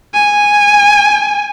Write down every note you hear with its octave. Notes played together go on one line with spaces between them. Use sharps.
G#5